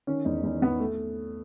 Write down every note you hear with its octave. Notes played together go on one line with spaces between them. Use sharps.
D#3 C#4
E2 D#4
E2 D#4
E2 B3
A3